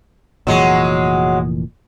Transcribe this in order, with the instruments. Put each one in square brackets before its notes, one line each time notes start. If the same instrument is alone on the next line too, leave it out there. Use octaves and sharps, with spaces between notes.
[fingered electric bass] F1 A#2 E3 [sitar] F#3 G#3